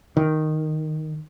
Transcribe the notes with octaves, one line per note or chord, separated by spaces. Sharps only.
D#3